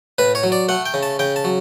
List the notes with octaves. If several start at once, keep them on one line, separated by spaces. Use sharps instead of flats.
A2 B4
C#5
F#3
D5
A3 F#5
G5
C#3
A5
C#3 G5
A5
F#3